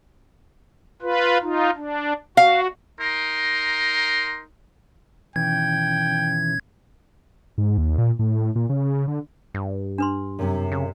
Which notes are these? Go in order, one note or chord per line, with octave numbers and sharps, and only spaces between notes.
F4 B4
D#4 F4
D4
F#4 F5
D#4 A#4 C6
B2 D#3 E3 C#4 G5 G#6
G#2
D#2
A#2
A2
A#2
C#3
D3
G2
D4 B4 C6
F#2 C3
C#3